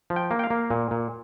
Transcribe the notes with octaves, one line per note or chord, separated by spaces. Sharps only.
F3
G5
A#3
G5
F5
A#3
A#2
A#2